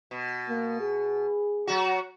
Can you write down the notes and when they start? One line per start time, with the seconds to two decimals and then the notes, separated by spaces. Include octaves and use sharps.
0.11 B2
0.48 A#3
0.80 G#4
1.67 F#3 F#4